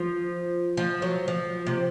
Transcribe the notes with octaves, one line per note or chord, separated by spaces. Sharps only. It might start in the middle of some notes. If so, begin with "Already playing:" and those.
Already playing: F3
F3
F#3
F3
C3